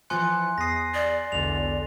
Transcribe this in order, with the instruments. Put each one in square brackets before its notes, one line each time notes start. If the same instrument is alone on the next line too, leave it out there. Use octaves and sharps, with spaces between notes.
[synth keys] E3 F3 C#7 [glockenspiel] G#5 C6 F#6
[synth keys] E2 D#6 [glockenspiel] A#6 C7
[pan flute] D5
[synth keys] B1 E2 D3 [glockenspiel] F7